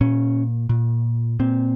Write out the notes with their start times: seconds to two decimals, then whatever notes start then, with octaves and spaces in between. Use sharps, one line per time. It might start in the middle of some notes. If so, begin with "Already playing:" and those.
0.01 A#2 C#4
0.69 A#2
1.39 A#2 C4